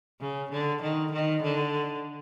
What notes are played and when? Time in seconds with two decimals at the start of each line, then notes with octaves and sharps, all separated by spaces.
0.21 C#3
0.52 D3
0.82 D#3
1.12 D#3
1.43 D3